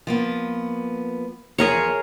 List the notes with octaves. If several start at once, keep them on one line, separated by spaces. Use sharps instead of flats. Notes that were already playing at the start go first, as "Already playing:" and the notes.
F3 A#3 B3
E2 F3 G#4 A#4 C#5